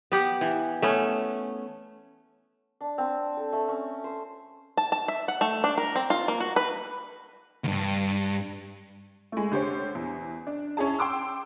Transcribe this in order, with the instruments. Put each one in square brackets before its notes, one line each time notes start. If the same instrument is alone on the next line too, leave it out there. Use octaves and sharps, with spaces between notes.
[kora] B3 G4 F#5
E3
A3 B3 C#4
[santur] D4
C4
A4
A3
C#4
C5
[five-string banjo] A5
A5
E5
F#5
A3
D4
A#4
C4
F4
A#3
F#4
B4
[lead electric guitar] D2 G2
[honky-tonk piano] G#3 A3
D3 G4 C5 C#5
E2
D4
C#4 E4 G#4 A5
G5 C6 D6 E6